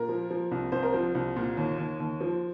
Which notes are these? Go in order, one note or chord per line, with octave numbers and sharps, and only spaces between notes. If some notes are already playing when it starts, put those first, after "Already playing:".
Already playing: A#2 A#4
F3
F3
C2
C2 C5
A#4
F3 C5
C2
A#2
D#2
D#2
D#2
F3